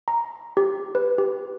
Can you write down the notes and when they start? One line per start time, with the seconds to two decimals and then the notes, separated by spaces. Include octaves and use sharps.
0.08 A#5
0.57 G4
0.95 B4
1.18 G4